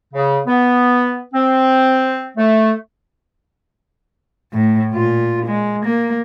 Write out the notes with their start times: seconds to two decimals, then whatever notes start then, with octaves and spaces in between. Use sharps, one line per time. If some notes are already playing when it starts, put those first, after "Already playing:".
0.14 C#3
0.47 B3
1.34 C4
2.37 A3
4.53 A2
4.92 A#2 F4
5.46 G#3
5.85 A#3